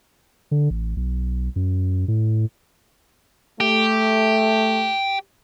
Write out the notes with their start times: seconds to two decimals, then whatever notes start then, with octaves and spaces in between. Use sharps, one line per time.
0.51 D3
0.70 A1
0.96 B1
1.56 F#2
2.08 A2
3.60 A3 G4